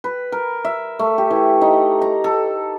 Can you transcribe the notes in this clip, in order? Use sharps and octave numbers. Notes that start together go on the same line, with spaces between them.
B4
A#4
E5
A3
G4
E3
D#4
A#5
A4